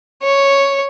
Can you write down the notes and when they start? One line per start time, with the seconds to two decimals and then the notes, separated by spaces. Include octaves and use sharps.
0.23 C#5